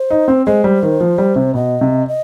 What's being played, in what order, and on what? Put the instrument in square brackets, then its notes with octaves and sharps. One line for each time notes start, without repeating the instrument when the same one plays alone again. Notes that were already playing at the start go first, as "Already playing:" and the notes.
Already playing: [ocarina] C5
[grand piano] D#4
C4
[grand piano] G#3 [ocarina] C5
[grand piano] G3
D#3
F3
G3
C3
[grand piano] B2 [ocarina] D#5
[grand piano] C3
[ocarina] D#5